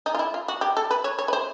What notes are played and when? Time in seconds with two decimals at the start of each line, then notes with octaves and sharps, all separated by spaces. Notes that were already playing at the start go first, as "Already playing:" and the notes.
0.06 D#4
0.15 F4
0.19 E4
0.34 F4
0.48 F#4
0.61 G4
0.77 A4
0.91 B4
1.04 C#5
1.19 C#5
1.28 B4
1.33 C5